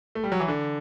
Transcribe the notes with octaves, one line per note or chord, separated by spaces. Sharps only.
A3
G3
F#3
E3
D3